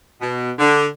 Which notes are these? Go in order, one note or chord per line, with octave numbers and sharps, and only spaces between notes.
B2
D3